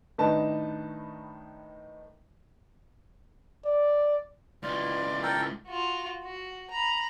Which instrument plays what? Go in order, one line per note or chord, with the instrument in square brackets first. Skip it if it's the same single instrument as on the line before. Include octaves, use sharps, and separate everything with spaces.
[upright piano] A2 D#3 D4 D#4 B4 A5
[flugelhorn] D5
[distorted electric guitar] C#2 E3 [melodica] F4 [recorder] D5
[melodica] A4 A#4 G5
[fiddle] F4 F#4
F#4
A#5 B5